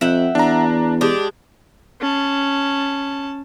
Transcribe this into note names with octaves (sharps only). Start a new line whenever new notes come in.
F2 E5 F#5 G5
E2 D4 A#5
G#3 D4 G4
C#4 A5